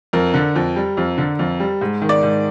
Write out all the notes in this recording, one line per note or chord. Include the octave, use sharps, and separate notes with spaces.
F2 A#4
D3
F2
G3
F2
D3
F2
G3
G#2
D#3
D5
G#2